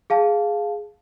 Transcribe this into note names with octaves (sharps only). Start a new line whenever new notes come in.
G#4 F5 A5